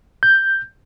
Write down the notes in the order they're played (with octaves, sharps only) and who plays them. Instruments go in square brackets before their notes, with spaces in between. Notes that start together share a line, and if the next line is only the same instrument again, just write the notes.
[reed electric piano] G6